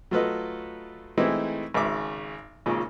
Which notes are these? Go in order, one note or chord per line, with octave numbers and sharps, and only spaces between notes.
F#3 A3 F4 A4 B4 D#5
E3 G#3 A3 C4 D#4 E4
G#1 C#3 E5 D6
G#1 A#2 C#3